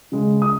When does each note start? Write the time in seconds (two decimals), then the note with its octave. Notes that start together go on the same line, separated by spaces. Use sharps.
0.12 C#3 G#3
0.42 D#6